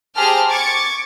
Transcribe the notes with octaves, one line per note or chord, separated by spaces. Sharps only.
G4 G#4 C5 A5 A#5 F6
C#6 D6 G#6 A6 C#7